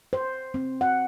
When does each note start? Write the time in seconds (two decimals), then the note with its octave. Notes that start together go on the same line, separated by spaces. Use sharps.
0.13 C5
0.54 C4
0.81 F#5